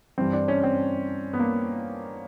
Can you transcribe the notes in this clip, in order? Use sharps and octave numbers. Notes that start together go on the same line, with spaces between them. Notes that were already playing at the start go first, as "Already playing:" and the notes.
G2 E3 G3 C4
D4
C#4
C4
B3
A#3